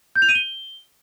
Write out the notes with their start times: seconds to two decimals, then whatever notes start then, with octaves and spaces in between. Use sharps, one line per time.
0.16 G6
0.22 F7
0.29 D#7
0.35 G7